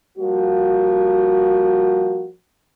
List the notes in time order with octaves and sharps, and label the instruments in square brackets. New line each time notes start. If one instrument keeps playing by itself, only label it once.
[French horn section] F3 G3 A#3 F#4